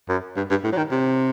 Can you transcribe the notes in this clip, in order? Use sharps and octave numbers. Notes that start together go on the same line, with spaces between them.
F#2
G2
G2
A2
F#3
D#3
C3